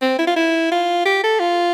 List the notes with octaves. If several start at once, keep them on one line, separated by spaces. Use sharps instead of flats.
C4
E4
F4
E4
F4
G4
A4
F4